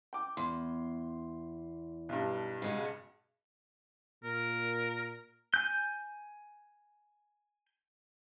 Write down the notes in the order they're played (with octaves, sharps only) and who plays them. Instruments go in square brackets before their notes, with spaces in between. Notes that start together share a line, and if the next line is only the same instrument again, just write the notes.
[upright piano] G5 D6
[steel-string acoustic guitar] E2 [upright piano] C6
[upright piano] B1 G2
[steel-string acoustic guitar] C#3 G#3 F#4
[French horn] A#2 [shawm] A#4
[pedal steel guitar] G#5 G6